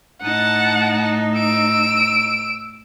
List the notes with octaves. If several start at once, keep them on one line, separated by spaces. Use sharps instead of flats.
A2 D#4 F#5 A5
E6 D7